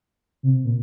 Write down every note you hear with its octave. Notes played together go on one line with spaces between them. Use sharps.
C3
A#2